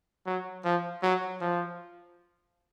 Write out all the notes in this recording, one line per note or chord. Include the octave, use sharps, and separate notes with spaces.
F#3
F3
F#3
F3